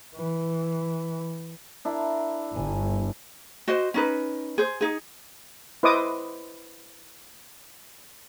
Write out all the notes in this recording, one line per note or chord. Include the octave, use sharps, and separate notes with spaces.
E3
D4 E4 A#4
G1 G#5
F#4 C5 D#5
C#4 D#4 B4
G#4 C5
D#4 G#4
E4 B4 C5 D#5 D6 D#6